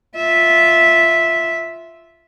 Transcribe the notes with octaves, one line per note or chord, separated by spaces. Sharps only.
F4 E5